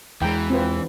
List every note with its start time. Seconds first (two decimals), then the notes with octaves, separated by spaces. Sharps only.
0.22 E2 E3 G#3 G5 A#5
0.50 C4 F4 B4